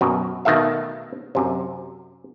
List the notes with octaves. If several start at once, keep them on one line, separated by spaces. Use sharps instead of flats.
F#2 B2
B2 D#3 A3 E5 F5
F#2 C3